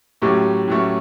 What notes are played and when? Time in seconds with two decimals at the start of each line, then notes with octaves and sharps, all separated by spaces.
0.22 A2 F#3 A3 C#4 G4
0.68 A2 F#3 A3 C#4